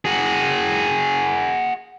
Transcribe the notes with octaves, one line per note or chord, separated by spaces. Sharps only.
F#4 G#4